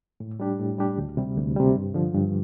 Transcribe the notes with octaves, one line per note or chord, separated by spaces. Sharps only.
A2
G3 D4 G4
A2
G3 D4 G4
D2
C3 G3
D2
C3 G3
G2
D3 F3
G2